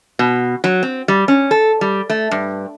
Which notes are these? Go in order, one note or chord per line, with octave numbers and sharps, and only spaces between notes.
B2
F#3
C4
G3
C#4
A4
G3
A3
G2